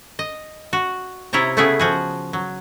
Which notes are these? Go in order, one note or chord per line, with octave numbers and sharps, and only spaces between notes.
D#5
F#4
C3 E4 F4 C#5 A#5
C#3 A3 B3 E4 G#4
F3 F#4 G#4
F#3